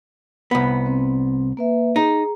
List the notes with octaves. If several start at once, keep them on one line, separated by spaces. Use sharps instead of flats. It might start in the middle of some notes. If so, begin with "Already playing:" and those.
C2 B3
C4
A#3 B4 E5
D#4 G#4 A#5